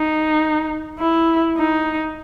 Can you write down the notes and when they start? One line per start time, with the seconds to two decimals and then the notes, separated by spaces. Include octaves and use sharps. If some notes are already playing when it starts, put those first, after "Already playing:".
Already playing: D#4
1.00 E4
1.57 D#4